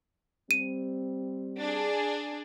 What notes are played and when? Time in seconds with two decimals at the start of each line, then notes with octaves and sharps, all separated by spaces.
0.51 G3 C4 D#7
1.60 D4 G#4